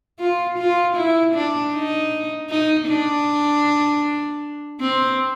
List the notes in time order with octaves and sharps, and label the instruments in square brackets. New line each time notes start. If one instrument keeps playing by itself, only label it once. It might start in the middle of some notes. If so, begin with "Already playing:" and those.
[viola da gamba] F4
F4
E4
D4
D#4
D#4
D4
C4